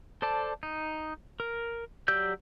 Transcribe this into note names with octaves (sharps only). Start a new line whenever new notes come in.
A4 C5 D5 A5
D#4
A#4
F#3 G4 D5 E6 G6